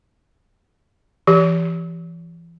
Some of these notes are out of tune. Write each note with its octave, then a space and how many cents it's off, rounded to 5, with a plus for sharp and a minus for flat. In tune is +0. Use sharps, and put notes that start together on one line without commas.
E3 +35 G4 +0